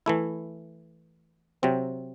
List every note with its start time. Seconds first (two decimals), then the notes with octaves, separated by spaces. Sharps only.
0.06 E3 A3 E4
1.63 C3 F#3 C4